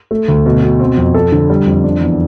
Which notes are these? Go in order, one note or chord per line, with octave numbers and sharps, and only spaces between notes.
A3
D2
B2
B2
C4
F2
A4
D3
G3
F2
D4
E2